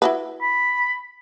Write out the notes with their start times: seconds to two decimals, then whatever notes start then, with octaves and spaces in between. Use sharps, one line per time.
0.02 E4 F#4 B4
0.42 B5